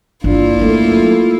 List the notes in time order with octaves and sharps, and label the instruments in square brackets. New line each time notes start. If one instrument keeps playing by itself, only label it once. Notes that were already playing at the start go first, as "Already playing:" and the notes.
[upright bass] G1 [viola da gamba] A#3 E4 F4 [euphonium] D4
[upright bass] F#3 [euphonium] A3